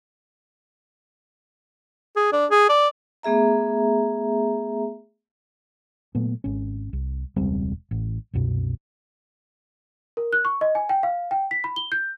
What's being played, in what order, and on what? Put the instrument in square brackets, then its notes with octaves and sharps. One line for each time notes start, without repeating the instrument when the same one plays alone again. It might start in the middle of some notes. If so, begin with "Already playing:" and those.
[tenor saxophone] G#4
D4
G#4
D5
[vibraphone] A3 B3 G#4 E5 A#5
[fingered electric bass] A#2 F#3 A3 B3
G#1 C#4
C2
E1 C#2 G3 C4
A1
C2 F#2 B2
[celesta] A#4
F#6
C#6
D#5
G#5
G5
F5
G5
B6
B5
G7
G6